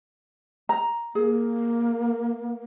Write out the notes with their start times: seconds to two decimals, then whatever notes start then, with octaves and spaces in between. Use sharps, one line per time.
0.69 A#5
1.15 A#3 G#4